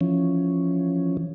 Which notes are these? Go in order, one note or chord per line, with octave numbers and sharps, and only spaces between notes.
E3 F3 C#4